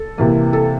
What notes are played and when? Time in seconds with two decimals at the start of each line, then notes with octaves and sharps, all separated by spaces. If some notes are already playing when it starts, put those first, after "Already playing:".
Already playing: A4
0.18 C3 E3 A#3
0.53 A4